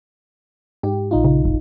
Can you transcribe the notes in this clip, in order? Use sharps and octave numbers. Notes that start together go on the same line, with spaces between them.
G#2 G4
A#1 D#4 F4
C#3
F#1